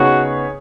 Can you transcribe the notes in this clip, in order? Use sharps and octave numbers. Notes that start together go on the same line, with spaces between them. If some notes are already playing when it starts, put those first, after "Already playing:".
Already playing: C#3 B3 D#4 F#4 G#4 C#5